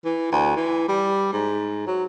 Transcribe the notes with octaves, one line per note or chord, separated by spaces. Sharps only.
E3
D2
E3
G3
G#2
F#3